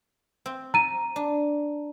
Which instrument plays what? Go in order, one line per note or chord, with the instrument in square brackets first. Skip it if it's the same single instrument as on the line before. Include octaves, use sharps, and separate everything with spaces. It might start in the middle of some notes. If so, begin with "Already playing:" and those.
[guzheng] C4
[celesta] A#5 D#7
[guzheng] D4